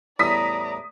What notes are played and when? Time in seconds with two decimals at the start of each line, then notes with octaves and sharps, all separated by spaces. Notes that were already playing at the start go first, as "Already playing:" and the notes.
0.19 E2 A2 G3 D5 A#5 D#6 B6